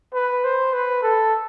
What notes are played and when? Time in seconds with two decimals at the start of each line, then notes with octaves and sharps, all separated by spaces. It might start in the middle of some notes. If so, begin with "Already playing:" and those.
0.14 B4
0.44 C5
0.74 B4
1.03 A4